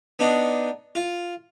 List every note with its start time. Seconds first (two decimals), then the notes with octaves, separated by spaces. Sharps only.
0.19 B3 D4 D#4
0.95 F4